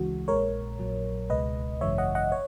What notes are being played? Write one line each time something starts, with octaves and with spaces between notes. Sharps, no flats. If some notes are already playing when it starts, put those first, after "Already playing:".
Already playing: C#2 C#3 E3 G#3 F#4
A#1 A#2 G#3 A#4 C#5
A#1 A#2 F#3
C#2 B2 G#3 B4 D#5
G#1 F#2 C#3 E3 G#3 C#5 E5
D#5 F#5
D#5 F#5
C#5